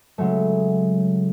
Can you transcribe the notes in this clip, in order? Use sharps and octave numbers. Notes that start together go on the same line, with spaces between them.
C#3 F#3 G#3 A3